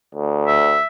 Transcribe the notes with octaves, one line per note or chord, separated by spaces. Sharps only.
D2
E5